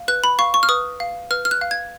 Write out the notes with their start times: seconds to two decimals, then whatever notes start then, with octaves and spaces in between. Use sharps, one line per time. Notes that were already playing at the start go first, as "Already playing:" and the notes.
Already playing: F5
0.08 B4 F#6
0.24 B5
0.39 F5 C#6
0.54 C#6
0.63 F6
0.69 B4 D#6
1.00 F5
1.31 B4 F6
1.45 F6
1.51 F#6
1.61 F5
1.71 G#6